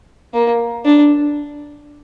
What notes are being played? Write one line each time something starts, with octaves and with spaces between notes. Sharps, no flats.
A#3
D4